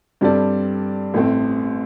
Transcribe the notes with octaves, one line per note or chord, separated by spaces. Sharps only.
G2 G3 C4 A4 D5
A1 A2 A3 C4